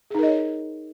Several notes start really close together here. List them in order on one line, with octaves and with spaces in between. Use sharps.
G#4 D#4 A#4 D#5 C#5